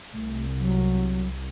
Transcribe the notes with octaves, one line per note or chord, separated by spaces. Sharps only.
C2 A3
F#3